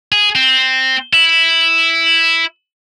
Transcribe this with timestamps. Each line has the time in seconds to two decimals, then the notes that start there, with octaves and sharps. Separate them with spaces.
0.12 G#4
0.35 C4
1.13 E4